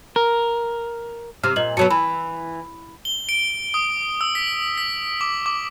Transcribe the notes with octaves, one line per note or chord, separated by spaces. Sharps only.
A#4
C3 F6
A#2 D#5 F#7
B2 F#3 B3 A5 C#7
E3 B5
G7
D7
D#6
E6
B6
B6
D6
D6